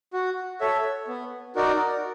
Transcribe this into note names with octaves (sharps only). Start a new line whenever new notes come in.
F#4
A4 C#5 E5
B3
D#4 F#4 A#4 D5